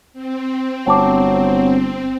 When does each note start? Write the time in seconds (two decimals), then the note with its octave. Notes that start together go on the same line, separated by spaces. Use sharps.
0.13 C4
0.86 G1 F#3 G5 A5 D6